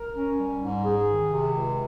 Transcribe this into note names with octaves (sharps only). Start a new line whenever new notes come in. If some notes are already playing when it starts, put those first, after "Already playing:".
Already playing: A#4
C#4
G3
G#2
G#4
D#3
C3
C#2